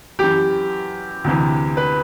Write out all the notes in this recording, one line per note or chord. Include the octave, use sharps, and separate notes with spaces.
F#2 E3 G4
D2 C3 E3
B4